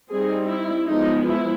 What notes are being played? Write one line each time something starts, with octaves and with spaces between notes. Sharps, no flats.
G3 C4 D#4 G#4
E4
F3 G#3 B3 D#4
E4